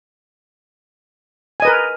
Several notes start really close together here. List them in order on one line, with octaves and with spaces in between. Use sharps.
G#5 D#5 B4 A#4